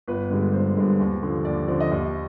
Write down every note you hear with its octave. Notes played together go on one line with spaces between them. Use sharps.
G1 B4
G2 D3 G#3
G1 C5
G2 D3 G#3
D#2
D3 F3
D#2 D5
D3 F3 D5
D#5
D#2 D#5